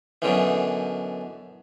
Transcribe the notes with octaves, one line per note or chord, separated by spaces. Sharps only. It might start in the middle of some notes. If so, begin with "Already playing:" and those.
F#2 B2 D3 E3